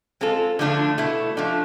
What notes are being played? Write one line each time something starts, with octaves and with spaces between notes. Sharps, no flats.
G#3 C4 F4 A4
D3 F3 A3 D4 F4
B2 A3 E4
F3 A3 D4